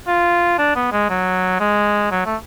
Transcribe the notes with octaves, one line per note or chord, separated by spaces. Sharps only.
F4
D4
B3
G#3
F#3
G#3
F#3
A3